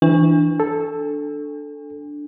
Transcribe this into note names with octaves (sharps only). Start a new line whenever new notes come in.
E3 D4
A4